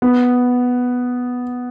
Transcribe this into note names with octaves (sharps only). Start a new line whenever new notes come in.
B3